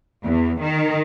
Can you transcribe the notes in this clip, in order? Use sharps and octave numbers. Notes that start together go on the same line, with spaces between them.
E2
D#3